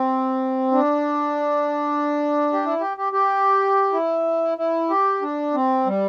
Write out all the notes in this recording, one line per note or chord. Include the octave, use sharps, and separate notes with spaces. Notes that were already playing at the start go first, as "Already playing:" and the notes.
Already playing: C4
D4
G4
E4
G4
G4
G4
E4
E4
G4
D4
C4
G3